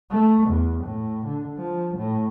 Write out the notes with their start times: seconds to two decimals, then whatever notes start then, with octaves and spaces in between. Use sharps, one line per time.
0.11 A3
0.46 E2
0.84 A2
1.26 D3
1.58 F3
1.97 A2